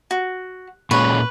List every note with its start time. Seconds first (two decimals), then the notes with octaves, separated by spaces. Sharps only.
0.11 F#4
0.91 A#2 G#3 C#4 B4 C#6